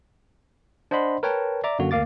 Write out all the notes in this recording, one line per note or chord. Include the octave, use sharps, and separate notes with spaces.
D4 C5 D#5 F#5 B5 C6
A#4 B4 C#5 G5 A5
D5 E5 A#5 D6
F#2 D3 A#3 F#4
D2 A#3 F5 D6 A6